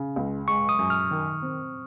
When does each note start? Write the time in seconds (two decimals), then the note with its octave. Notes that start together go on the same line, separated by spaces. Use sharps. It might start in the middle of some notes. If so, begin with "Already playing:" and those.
Already playing: C#3
0.16 C#2
0.48 G#3 C#6
0.69 D#6
0.79 F#2
0.90 F6
1.11 D#3
1.42 C4